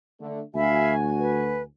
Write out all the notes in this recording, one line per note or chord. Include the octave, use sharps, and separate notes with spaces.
D3 A3
D2 D3 F#4 E5 F5 G#5 B5
B4